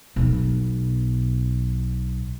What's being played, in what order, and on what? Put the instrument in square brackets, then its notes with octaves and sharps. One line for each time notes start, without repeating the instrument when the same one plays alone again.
[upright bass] B1 B2